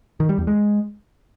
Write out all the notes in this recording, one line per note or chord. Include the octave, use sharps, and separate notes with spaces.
D#3
G3
E2
G#3